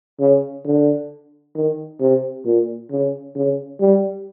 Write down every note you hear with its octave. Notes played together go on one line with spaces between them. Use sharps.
C#3
D3
D#3
C3
A#2
C#3
C#3
G3